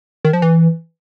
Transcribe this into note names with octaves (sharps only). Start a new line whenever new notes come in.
D#3
F3
E3